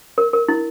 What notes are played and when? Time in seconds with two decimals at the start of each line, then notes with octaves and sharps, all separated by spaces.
0.18 A#4
0.33 A#4
0.48 E4